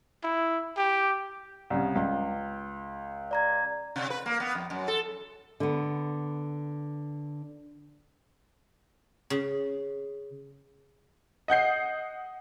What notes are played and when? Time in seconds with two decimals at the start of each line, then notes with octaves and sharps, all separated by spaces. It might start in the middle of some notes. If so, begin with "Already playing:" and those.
0.23 E4
0.77 G4
1.70 C2 C#3
1.95 C#2
3.31 D5 A#5 G#6
3.96 C3
4.10 B4
4.26 A#3
4.40 B3
4.55 F2
4.70 F#2
4.88 A4
5.60 D3 B3
9.30 C#3
11.48 D#5 F#5 G6 C7